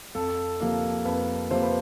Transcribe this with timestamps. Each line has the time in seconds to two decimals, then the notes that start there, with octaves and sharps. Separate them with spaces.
0.15 F2 A4
0.60 C3 F3 A#3
1.05 F2 B4
1.50 C3 F3 A#3 C5
1.62 B4